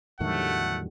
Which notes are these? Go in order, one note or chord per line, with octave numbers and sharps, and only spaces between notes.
E2 A2 D3 D#3 F#3 G3 A3 F#5